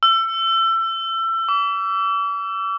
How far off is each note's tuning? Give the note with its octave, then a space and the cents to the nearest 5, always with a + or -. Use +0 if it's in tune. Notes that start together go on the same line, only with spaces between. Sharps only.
E6 +25
D6 -40